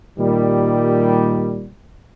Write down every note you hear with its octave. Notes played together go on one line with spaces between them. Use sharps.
A#2 D#3 G3